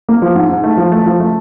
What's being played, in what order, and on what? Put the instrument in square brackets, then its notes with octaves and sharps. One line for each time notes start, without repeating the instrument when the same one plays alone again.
[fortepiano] A#3
F3
G#2
G#2
A3
F3
A3
F3
A3